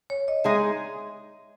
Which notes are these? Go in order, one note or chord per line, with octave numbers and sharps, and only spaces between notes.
C#5
D#5
G#3 D#4 G#4 E5